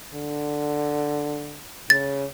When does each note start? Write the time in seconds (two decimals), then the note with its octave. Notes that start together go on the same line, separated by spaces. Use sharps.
0.14 D3
1.90 C#3 A6